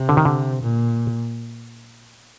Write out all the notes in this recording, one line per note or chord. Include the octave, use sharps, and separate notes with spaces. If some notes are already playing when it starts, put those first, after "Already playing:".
Already playing: C3
D3
D#3
D3
A#2